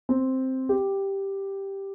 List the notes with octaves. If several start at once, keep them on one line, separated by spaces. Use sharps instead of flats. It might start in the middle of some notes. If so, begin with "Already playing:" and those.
C4
G4